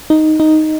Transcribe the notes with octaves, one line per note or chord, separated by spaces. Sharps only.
D#4
D#4